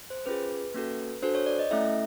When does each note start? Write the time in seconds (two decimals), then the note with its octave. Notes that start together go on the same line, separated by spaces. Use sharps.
0.10 C5
0.26 C#4 F4 G#4 B4
0.74 A#3 C#4 F#4 A4
1.22 D4 F#4 A4 C5
1.35 C#5
1.46 D5
1.59 D#5
1.71 A3 C#4 E4 A4 E5